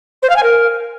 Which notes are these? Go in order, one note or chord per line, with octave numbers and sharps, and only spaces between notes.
C5
F5
G#5
A#4